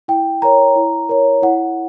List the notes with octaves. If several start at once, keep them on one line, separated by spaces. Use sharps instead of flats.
E4 G5
A#4 C#5 A#5
E4
A#4 C#5
E4 F#5